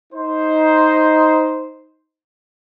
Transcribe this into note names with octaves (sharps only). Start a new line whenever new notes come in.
D#4 C5